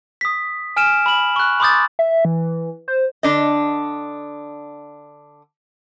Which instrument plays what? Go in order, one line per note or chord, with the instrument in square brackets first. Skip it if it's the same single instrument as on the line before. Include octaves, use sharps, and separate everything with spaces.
[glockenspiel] D#6 B6
G#5 F6 D7 E7
B5 F#7
C#6 F#6
B5 C6 D6 D#6 G6 A6
[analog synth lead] E5
E3
C5
[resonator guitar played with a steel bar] D3 D4 D#5